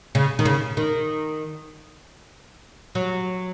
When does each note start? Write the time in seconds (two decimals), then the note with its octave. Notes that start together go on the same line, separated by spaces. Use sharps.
0.15 C#3
0.39 D#3
0.45 C#3
0.77 D#3
2.95 F#3